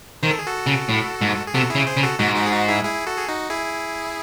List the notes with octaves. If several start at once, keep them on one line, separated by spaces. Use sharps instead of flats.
D#3 C5
A4
G#4
F#4 A4
C#3
A2
G#2
G#4
C3 F#4 A4
E4 G#4
C#3
G#4 C5
C#3
F#4 A4
G#2 D#4 F#4
D#4 F#4
G#4
D#4 F#4
E4 G#4
E4 G#4
F#4 A4
G#4
D#4 F#4
E4 G#4